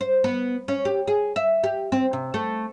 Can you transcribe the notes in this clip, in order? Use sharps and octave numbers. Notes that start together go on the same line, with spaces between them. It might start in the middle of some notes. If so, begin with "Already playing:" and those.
C5
B3
C#4
G4
G#4
E5
G4
C4
C3
A3